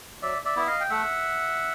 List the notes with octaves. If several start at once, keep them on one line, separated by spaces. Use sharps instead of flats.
F#3 D5 E5
D5 E5
B3 E4 E5
D#5 F5
G5
A3 E5 F#5